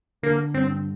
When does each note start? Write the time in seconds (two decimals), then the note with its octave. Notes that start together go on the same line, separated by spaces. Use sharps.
0.23 D3 A#3
0.54 G2 C4